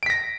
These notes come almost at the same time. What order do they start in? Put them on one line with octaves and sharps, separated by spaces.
D7 B6 A#6